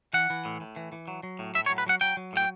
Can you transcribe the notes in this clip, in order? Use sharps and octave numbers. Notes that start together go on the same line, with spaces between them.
E3 F#5
E3
A2
A2
E3
E3
F#3
F#3
A2
A2 E5
C#5
F#3
B4
F#3 F#5
F#3 G5
F#3
A2 G5